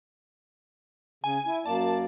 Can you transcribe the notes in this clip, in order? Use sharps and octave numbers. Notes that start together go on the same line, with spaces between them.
C#3 G#5
E4
F#2 A#3 D5 A5